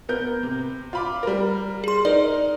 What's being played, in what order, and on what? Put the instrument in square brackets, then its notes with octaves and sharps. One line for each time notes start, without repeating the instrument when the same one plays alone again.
[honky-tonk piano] B3 A#4 G6
C3
F4 B5 D6
G3 A#4
[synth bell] G#4 C6
[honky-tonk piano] D#4 A#4 [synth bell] D5